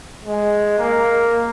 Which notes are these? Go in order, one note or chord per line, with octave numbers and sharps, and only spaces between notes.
G#3
A#3